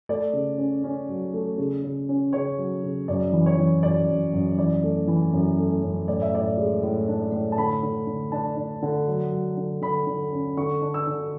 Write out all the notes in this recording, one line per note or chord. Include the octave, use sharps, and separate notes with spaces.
A3 D5
C#3
C#4
C#4
F#3
A3
C#3
C#3
C#4
C#3 C#5
F#3
C#3
F#2 D5
E3
C#5
E3
F#2 D5
F#2
F#2
E3 D5
A3
E3
F#2
A3
F#2
A2 D5
E5
A2 D5
G#3
A2
D4
A2
A5
D3 B5
D3
D3
D4 A5
D4
D3
F#3
F#3
D3
D3 B5
D3
C#4
D3 C#6
D4
E6
D3